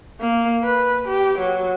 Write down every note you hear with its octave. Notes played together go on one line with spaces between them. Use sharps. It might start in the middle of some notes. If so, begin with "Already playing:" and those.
A#3
B4
G4
F#3